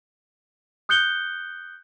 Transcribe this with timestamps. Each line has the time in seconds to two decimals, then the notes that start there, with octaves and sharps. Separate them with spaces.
0.89 D#6 F#6 G6 C#7 G7